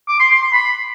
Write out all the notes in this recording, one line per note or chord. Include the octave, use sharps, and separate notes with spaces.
D6
C6
C6
C6
B5